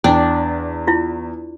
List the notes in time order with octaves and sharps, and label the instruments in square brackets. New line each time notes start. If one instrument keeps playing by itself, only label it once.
[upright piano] E2 [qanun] D4 [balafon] G5
[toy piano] E4 F4